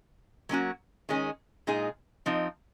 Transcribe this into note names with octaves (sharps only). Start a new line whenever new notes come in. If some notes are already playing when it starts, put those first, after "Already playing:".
F#3 A#3 C#4 F#4
D#3 G#3 C#4 G#4
A#2 G#3 D#4 G#4
F3 C4 D#4